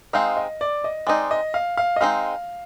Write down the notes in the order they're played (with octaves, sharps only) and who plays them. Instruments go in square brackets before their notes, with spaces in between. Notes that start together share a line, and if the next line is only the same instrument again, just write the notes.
[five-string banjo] G#3 C4 D#4 [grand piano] F5
[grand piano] D#5
D5
D#5
[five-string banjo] G#3 C4 D#4 [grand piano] D5
[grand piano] D#5
F5
F5
D#5
[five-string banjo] G#3 C4 D#4 [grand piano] F5